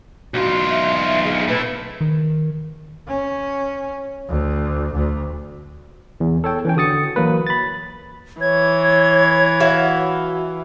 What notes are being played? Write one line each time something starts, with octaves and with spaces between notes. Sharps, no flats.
B1 F4 F#4
E5
E5
G#4
A3 E4 B4
D#3
C#4
D2
D2
E2
A4 C#5 G5
E3 C#4 G5
D3 F#4 D#6 A6 C#7
E3 F#3 A#3 B4
B5 A6
E3 C#5 G#6
F#4 E5 F5